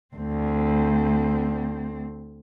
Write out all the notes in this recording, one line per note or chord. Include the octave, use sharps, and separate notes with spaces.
D2 C4